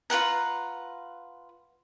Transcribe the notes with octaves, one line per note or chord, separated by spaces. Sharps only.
F4 B4 F#5 A#5